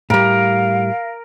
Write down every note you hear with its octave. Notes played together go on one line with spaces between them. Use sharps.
A2 G3 A#4 F5